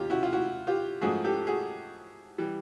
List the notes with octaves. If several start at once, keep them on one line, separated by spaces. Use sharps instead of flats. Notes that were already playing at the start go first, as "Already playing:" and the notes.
Already playing: D#2 F#3 F4 G4
E4 F#4
F4
E4 F#4
F4 G4
G#2 F3 A3 F#4 G#4
G4 A4
F#4 G#4
E3 G3